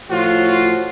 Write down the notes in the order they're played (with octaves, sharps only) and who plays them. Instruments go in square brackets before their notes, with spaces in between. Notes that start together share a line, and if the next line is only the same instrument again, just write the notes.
[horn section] A2 F3 F4 F#4